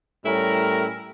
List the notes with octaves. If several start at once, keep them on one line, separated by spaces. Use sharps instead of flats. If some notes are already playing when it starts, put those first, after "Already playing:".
A2 G3 C#4 E4 A#4